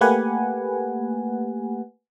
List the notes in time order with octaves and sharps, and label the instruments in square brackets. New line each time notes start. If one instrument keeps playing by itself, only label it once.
[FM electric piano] A3 A#3 G4 B4 F#5 G#5